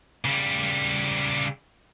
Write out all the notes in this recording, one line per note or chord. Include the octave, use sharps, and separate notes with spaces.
C#3 G3